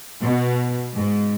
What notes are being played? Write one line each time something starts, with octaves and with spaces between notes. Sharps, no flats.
B2
G#2